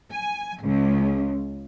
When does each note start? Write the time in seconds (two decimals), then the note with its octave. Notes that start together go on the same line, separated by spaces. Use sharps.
0.12 G#5
0.62 C#2